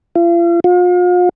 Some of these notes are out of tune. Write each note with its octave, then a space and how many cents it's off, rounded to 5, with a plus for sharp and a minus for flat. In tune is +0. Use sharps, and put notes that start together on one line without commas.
F4 -40
F4 +40